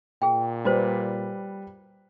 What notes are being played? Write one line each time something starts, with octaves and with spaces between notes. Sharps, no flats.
A#2 G#4 G5
G3 F#4 B4 C5